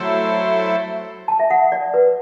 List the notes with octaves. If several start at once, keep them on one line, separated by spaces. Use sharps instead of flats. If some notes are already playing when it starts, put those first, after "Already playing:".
Already playing: F#3 A3 E4 A4 C5
A5
E5
F#5
D5
B4